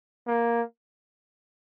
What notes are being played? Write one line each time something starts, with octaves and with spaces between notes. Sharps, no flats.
A#3